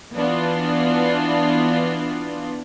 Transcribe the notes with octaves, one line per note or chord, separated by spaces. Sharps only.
E3 B3 D4 F4